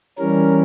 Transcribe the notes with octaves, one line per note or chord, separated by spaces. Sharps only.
E3 G3 C#4 A#4